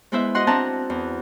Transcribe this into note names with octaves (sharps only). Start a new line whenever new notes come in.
G#3 B3 E4 C5 E5
F#4 D#5 F#5 C6
C4 D4 E4 F#5 A5 A#5
E2